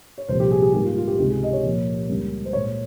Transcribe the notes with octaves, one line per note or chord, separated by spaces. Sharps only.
C#5
C2 A#2 F3 C5
G4
G#4
G#4
G#2 D#3 G3 A#3 G4
F4
F4
G4
C#2 C3 D#3 G#3 G4
G#4
D#5
C#5
A#2 F3 A#3
C#2 C#3 G3 A#3
C5
A#2 G#3 C#5